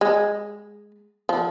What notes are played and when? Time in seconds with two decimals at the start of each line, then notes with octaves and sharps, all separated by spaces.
0.01 G#3
1.29 F3